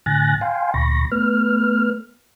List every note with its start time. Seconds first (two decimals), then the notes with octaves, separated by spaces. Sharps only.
0.06 A2 D3 G#5 F#6 A6 A#6
0.41 F5 G5 G#5 C6
0.74 D2 A#2 B5 C#6 A#6
1.12 A3 B3 B4 F6